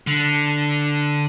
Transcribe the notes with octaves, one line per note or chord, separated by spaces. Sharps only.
D3